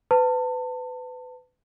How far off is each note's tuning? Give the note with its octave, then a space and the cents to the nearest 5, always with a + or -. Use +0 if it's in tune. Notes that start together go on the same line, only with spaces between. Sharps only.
B4 +30 A5 +30